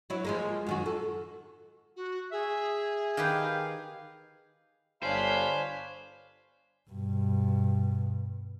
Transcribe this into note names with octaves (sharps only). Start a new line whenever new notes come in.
F#3 E4
F3 G#3 A#3
F#2 D#3 F#4
A4
F#4
G#4 E5
D#3 G4 B4 F5
G1 D4 C5 C#5 F5 G#5 B5
G2 B2